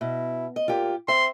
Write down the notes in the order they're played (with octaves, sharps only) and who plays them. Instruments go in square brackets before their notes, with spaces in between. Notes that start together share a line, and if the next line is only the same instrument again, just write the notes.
[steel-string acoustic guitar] B2 [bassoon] E4
[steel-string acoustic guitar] D#5
[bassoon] A#2 [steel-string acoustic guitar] F4 G4
[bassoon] C4 [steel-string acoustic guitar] E5 [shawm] C6